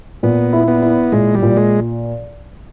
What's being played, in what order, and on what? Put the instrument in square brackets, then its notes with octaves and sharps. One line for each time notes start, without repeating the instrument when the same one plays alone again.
[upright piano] A#2 [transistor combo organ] B3
[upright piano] E4
[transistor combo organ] B3
[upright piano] E4
[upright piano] A#2 [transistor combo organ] G#3
[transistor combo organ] G3
[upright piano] A#2
[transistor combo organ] G#3